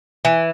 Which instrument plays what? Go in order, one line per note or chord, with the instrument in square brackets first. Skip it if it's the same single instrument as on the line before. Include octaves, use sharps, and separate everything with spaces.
[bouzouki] E3